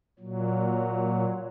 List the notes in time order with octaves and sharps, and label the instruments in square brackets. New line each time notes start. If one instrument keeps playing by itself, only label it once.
[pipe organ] A#2 F#3